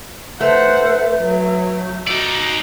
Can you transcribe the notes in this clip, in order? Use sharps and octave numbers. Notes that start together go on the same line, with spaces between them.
A3 B4 C5 F#5
F#3
D#4 F#4 D5